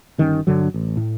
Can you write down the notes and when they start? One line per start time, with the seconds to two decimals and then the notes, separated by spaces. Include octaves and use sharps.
0.18 G1 D#3 G3 C#4
0.47 G2 D3 F#3
0.74 A1
0.97 A2